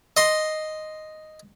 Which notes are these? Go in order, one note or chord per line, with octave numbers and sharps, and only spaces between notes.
D#5 C6